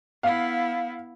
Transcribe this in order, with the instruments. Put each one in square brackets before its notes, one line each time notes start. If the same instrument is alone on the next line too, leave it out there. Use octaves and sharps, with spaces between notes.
[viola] B3 E4 [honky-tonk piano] F5